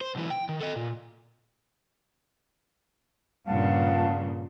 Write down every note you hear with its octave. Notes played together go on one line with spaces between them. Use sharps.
C5
B1 E3
G5
D#3
A4 D#5
A#2
G2 A#2 C#3 F5 F#5 A5